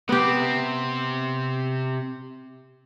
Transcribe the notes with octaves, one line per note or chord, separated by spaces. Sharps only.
C3 B3 C4 G4